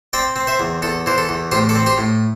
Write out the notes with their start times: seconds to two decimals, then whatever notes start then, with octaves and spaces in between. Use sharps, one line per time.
0.13 C4 D5 G5
0.36 C4
0.47 C5 E5
0.60 E2
0.82 E2 A4
1.06 E3 C5
1.18 A4
1.29 E2
1.51 A2 G4 C5
1.69 A4 D5
1.75 C4
1.86 G4 C5
1.98 A2